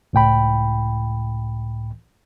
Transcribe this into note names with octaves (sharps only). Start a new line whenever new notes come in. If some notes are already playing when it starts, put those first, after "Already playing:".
C#2 A2 G5 B5